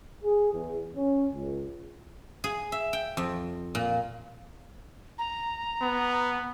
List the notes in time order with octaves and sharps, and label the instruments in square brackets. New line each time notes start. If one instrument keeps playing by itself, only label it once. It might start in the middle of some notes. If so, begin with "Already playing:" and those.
[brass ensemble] G#4
E2
C#4
C#2
[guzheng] G#4
E5
G5
F2
A#2
[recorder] A#5
[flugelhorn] B3